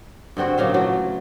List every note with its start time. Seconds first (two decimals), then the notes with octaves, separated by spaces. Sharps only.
0.37 G2 D3 C4 F#4
0.58 A#2 C#3 F#3 F5
0.74 E3 F#3 A3